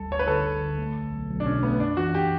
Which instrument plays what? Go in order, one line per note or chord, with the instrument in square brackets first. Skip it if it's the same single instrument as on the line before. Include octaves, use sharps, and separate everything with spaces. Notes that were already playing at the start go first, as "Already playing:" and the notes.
Already playing: [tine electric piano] G1 D2 G3 [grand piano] A4
[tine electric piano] D2 [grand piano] C#5
[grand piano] B4
[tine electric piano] D3 [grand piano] A4
[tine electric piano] D2
D3
A3
B1
B1
B1
[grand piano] D4
[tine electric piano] B2 [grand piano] C#4
[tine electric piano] A3 [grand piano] B3
[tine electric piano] F#2 [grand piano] D4
[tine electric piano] E3 [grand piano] F#4
[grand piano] G4